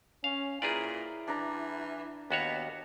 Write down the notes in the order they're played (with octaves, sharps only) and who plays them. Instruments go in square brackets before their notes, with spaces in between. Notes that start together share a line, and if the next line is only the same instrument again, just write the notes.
[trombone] C#4 [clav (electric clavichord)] F5
[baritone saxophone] A#2 [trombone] E4 [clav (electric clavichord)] G#4 B4 D5
[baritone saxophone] E3 [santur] D4 A#5
[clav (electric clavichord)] D#2 F#4 C#5 [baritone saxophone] B3